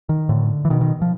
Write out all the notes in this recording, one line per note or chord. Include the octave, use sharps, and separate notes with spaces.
D#3
A2 D3
E3
B2 D#3
D#3
F3